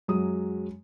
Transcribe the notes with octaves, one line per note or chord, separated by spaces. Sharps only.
F#2 F#3 G#3 D#6